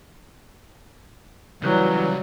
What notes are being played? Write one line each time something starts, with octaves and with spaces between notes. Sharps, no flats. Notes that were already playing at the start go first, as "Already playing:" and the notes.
C#2 C#3 E3 F#3 G3